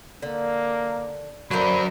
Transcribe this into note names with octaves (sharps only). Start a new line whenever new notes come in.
D3 A#3
A#2 D3 F#3 A#4 C5 B5